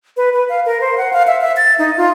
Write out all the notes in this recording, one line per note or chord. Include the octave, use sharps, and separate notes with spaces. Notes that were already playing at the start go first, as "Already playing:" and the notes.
B4
B4
F5
A#4
C5
F#5
F5
E5
E5
A6
D#4
F4